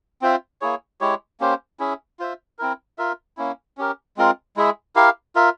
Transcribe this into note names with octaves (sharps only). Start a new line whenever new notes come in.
C4 F4 C5 E5
A#3 E4 G#4 C#5
G#3 E4 G4 C#5
A#3 C#4 G4 C5
C#4 E4 G#4 E5
F4 C5 E5
C4 E4 A#4
F4 A#4 E5
A#3 C#4 E4
C#4 G4 A#4
G#3 C4 F4 A#4
G#3 E4 G#4 E5
E4 G4 A#4 F5
F4 A#4 E5